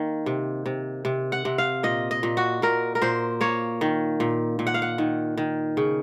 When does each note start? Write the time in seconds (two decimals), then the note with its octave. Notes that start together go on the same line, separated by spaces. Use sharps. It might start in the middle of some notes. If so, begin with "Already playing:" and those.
Already playing: D#3 A#3
0.26 C3
0.66 C3
1.05 C3
1.32 F#5
1.45 C3
1.58 F5
1.83 A#2 D#5
2.11 D#5
2.23 A#2
2.37 F#4
2.62 A#2 A#4
2.95 A#4
3.02 A#2 C5
3.41 A#3 C#5
3.81 D#3
4.20 A#2
4.59 A#2
4.67 F#5
4.74 F5
4.82 F#5
4.98 D#3
5.37 D#3
5.77 C#3